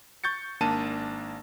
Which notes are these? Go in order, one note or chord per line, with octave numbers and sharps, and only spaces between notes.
C#6 G6 A6 C#7
G#1 A#3 D4 A5 D#7